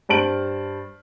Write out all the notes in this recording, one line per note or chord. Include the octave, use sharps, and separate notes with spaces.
G2 C5 A5 D7 F#7